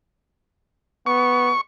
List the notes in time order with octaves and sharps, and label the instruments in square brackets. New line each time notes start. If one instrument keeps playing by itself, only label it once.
[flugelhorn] B3 [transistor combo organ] C#6